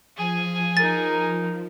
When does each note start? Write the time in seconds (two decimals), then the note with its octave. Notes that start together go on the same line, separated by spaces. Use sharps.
0.17 F3 G#4 G#5
0.77 D#4 A#4 A6